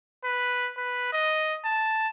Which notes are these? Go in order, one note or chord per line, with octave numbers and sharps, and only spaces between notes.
B4
B4
D#5
A5